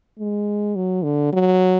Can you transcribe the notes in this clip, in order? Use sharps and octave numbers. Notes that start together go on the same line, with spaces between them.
G#3
F#3
D3
F#3